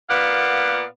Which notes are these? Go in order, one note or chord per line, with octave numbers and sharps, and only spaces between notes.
A#2 A#3 B3 D5 F5 F#5